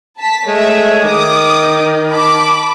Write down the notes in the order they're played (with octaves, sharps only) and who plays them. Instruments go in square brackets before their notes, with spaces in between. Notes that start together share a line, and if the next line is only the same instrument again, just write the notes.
[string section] A5 B6
[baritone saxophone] G#3 [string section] A3 C#5 E5
[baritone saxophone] D#3 [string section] D6 D#6
[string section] A5 B5 D6